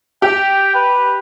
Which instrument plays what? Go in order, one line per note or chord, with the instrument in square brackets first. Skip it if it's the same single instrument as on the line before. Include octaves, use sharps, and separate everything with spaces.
[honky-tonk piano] G4 [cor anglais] G5
[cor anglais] B4